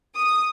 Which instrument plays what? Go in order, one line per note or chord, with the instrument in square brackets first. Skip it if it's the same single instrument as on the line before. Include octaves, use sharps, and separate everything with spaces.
[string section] D#6